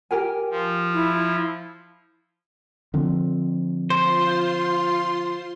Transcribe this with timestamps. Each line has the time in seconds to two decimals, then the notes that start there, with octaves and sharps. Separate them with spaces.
0.11 G4 A#4 G#5
0.51 F3
0.93 E4
2.94 D3 F3 C4
3.90 F4 C5 C6